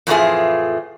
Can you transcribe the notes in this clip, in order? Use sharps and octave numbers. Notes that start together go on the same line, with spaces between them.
F2 A2 E3 F3 A3 G#4